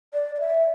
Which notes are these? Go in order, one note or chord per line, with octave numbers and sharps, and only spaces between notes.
D5
D5
E5